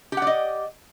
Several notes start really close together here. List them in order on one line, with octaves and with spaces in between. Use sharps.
G4 F#5 D5 D#5